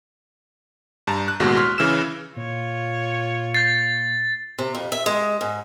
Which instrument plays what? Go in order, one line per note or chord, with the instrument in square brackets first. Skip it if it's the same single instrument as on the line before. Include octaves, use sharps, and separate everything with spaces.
[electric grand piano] G2 A5 A#5
F#6
A1 D#2 B2 G#3 F#4
C6 C#6 F6 B6
C#3 E3 E6 F6 E7
[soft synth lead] A#2 [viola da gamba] F4 C#5
[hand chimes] G6 C7 [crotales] A6
[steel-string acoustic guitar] C3
F2
E5
G#3
G#2